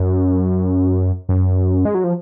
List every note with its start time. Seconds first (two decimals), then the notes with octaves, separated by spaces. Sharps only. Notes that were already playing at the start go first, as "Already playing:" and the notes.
Already playing: F#2
1.29 F#2
1.85 G#3
1.95 F#3
2.04 F3